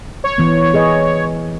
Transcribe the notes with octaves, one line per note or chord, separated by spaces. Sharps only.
C#5
E3 B3
G#4 B4 D#5